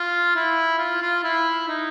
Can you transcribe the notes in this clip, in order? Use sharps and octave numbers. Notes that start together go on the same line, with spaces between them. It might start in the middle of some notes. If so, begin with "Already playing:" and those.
Already playing: F4
E4
F4
F4
E4
D#4